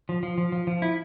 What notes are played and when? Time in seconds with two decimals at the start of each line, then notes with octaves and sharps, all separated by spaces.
0.09 F3
0.23 F3
0.38 F3
0.52 F3
0.67 F3
0.82 E4